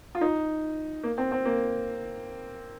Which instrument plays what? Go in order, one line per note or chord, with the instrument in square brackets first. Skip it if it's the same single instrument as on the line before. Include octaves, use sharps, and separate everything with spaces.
[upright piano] F4
D#4
A#3
C4
C4
A#3